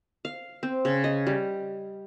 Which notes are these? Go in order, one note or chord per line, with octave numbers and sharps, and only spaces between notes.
F5
C4
C#3
D#5
G3